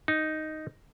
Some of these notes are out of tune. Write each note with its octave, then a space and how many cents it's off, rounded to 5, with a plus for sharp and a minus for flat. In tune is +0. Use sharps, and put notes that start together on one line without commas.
D#4 +0